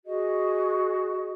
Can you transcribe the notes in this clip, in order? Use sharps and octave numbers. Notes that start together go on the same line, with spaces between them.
F#4 G#4 D#5